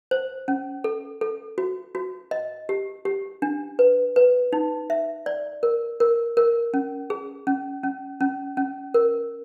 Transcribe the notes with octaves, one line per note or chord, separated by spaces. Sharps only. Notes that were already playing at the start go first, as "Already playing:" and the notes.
C5
C#4
A4
A4
F#4
F#4
D#5
G4
G4
D4
B4
B4
D#4
E5
D5
A#4
A#4
A#4
C#4
G#4
C#4
C#4
C#4
C#4
A#4